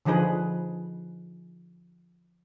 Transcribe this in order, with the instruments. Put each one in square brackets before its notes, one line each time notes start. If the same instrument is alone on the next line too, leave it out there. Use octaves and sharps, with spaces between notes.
[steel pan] D3 F3 D#4 G#4 B4